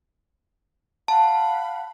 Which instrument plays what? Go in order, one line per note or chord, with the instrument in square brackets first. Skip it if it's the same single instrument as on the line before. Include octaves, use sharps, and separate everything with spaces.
[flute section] F5 F#5 B5 [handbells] A5